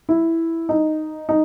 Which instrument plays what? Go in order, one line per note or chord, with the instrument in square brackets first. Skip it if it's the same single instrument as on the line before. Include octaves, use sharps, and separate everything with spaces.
[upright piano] E4
D#4
D#4